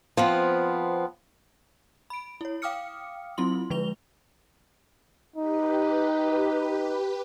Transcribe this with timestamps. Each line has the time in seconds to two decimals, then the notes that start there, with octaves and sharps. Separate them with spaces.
0.17 F3 B3 C4
2.10 B5 D7
2.41 E4 C#5
2.62 F5 G5 D6 D#6 F6 C#7
3.38 F#3 C4 E4 F4 C6 F#7
3.70 D3 F3 G#3 B4 F7 G7
5.36 D#4 G4 B4